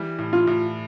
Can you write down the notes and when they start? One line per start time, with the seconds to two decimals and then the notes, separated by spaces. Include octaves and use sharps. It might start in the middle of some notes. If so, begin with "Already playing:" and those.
Already playing: E3 G3
0.19 A2
0.33 F4
0.47 A2